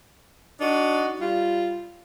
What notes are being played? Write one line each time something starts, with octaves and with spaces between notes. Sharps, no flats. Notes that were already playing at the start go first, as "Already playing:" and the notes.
D4 D#4 F#4
G3 F4